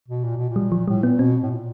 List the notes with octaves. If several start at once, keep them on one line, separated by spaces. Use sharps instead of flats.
B2
A#2
B2
A#2
G3
F3
A2 G3
A#2 B3
B2 C4
A2
A#2